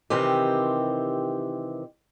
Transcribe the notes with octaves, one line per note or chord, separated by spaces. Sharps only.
C3 D#3 E3 C4 G4